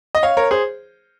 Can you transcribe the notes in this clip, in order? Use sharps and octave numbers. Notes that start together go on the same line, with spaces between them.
D#5
C#5 F5
A#4 C#5
G#4 C5